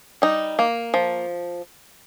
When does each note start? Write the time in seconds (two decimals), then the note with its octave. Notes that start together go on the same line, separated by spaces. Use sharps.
0.22 G3 D#4
0.59 A#3
0.94 F3